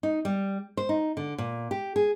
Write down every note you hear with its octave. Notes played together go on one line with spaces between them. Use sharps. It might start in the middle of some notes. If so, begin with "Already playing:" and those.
D#4
G3
C5
D#4
D3
A#2
G4
G#4